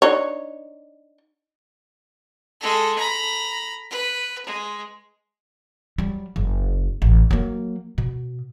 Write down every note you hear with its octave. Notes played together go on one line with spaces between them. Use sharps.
D4 D#4 C#5
G#3 A4
A#5 B5
B4
G#3
F#3 G3
F#1
A1
F#3 A#3
B2